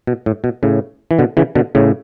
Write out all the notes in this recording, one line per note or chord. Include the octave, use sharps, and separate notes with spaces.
B2
A2
B2
A2 C#3
E3
B2 D3
C#3 E3
B2 D3
A2 C#3